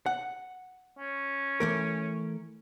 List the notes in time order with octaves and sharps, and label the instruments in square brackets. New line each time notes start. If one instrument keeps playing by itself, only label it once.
[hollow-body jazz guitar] F#5
[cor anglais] C#4
[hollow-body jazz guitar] E3 A3 A#4